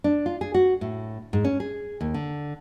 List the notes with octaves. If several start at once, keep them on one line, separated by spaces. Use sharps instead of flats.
D4
F4
G#4
F#4
A2
G#2
C#4
G#4
D#2
D3